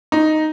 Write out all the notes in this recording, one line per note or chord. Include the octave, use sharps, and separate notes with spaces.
D#4